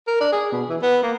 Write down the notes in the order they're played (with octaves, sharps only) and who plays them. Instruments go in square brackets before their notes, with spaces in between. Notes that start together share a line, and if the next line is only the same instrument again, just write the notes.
[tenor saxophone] A#4
D4
G#4
B2
E3
B3
A#3